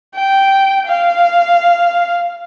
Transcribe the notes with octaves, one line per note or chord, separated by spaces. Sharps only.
G5
F5